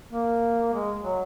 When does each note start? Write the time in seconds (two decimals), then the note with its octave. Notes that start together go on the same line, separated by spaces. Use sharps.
0.12 A#3
0.73 G#3
1.04 F#3